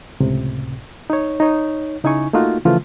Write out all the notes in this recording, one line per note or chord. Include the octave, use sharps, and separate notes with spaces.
C#2 A2 C3
D#4 C#5
D#4 C#5
C#3 D#4 E4 G#5 C#6
A3 A#3 D#4 F4 F#4
C#3 E3 F3 A3 F4